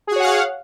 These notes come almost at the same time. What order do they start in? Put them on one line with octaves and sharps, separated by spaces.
G#4 F#4 C#5 F#5 F5